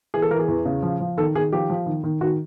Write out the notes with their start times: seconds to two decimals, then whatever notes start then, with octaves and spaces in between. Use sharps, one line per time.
0.14 E3 G#4
0.22 A4
0.31 E3 A#4
0.39 G#4
0.48 E2
0.65 C#3
0.82 F3
1.00 F3
1.17 D#3 A4
1.35 D#3 G#4
1.52 F3 G4
1.70 F3
1.86 D#3
2.04 D#3
2.21 D#3 F#4